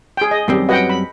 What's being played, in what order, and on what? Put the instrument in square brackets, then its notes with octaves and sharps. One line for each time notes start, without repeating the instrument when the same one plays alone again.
[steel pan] G#4 G5
D#5
[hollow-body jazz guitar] F#2 G3 C4 [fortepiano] D#3 G4
[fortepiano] C#4 F#4 B4 [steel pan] D#5 F#5 G5
[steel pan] B5